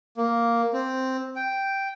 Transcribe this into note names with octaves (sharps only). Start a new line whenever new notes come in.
A#3
C4
G5